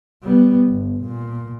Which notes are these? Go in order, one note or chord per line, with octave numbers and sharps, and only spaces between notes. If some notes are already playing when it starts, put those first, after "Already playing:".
G3 B3
G1
A#2